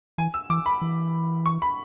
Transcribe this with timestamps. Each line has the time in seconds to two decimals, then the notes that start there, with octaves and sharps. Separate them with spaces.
0.18 E3 G#5
0.34 E6
0.50 E3 D6
0.66 B5
0.81 E3
1.46 C#6
1.62 B5